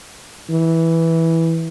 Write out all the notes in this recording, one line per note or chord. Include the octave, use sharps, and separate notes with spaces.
E3